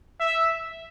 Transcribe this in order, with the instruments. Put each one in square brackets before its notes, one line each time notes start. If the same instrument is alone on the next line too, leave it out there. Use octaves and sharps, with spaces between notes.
[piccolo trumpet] E5